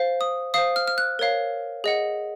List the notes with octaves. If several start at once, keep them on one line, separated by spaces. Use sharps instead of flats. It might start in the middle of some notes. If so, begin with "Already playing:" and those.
Already playing: C5 F5
D#6
C5 F5 D#6
F6
F6
F#6
A#4 C#5 F5
G#4 D#5 F#5